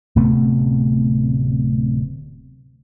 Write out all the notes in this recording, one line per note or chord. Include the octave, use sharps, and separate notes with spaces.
D1 C3 A3 B3